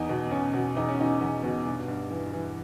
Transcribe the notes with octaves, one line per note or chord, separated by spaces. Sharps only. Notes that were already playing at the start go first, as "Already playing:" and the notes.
Already playing: E2 D#4
B2
B2 C#4
B2
E2 D#4
C#4
B2 D#4
E2
B2
G2
G2
E3
E3